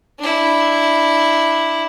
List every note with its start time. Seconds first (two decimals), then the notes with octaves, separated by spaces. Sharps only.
0.19 D4 E4